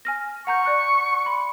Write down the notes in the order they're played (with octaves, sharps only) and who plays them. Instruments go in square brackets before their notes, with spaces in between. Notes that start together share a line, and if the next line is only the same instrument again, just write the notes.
[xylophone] G#5 F6 A#6
[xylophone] F#5 A#5 G6 [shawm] C#6
[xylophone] D5 F#6 C#7
B5 C6